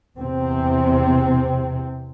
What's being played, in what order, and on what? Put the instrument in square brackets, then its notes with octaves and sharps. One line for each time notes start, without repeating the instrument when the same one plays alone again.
[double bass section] E2 C3 C4